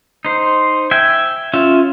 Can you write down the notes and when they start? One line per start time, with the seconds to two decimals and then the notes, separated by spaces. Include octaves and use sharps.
0.25 D#4 C5
0.91 E5 G5 G#5
1.53 C#4 F4 E5